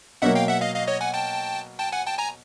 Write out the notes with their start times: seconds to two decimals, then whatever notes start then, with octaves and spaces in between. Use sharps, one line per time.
0.22 B2 F#3 A#3 E5 F#5
0.35 F5 G5
0.49 E5 F#5
0.61 D#5 F5
0.75 D#5 F5
0.88 C#5 D#5
1.01 F#5 G#5
1.14 G5 A5
1.79 G5 A5
1.92 F#5 G#5
2.06 G5 A5
2.19 G#5 A#5